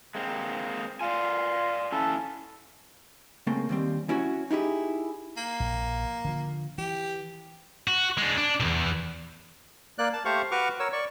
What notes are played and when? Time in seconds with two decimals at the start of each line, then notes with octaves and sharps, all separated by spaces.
0.15 G#3 A#3 C4
1.01 F4 D5 F5 G#5
1.92 C#4 E4 A4
3.47 C#3 A3 A#3 C4
3.69 D#2 G3 C4
4.09 C#4 E4 F#4 C#5
4.51 D#4 E4 G4 G#4
5.37 A#3
5.60 A#1
6.25 D3 D#3 F3
6.78 E3 G4
7.87 F#4
8.18 G#3 D4
8.38 D4
8.60 B1 E2
9.98 A#3 D5 F#6
10.13 A5
10.25 A3 G4 C5 F5 C#6
10.51 F#4 B4 C#6 D6 F6
10.80 A#4 C#5 E6
10.93 D5 C#6